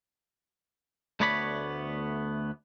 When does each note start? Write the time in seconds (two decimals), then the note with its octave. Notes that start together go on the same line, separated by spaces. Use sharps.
1.20 D2 A3 B3 C#5 D5 B5